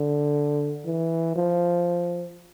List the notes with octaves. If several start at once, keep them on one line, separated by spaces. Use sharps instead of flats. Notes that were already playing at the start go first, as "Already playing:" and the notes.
Already playing: D3
E3
F3